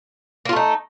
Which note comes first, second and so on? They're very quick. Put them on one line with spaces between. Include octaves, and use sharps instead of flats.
A#3 F4 A3 D#4